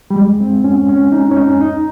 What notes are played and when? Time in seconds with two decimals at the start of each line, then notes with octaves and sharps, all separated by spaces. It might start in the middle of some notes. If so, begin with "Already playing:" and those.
0.11 G3
0.16 G#3
0.40 C4
0.64 C#4
0.89 C#4
1.12 D#4
1.31 C#4
1.36 D#4
1.61 D#4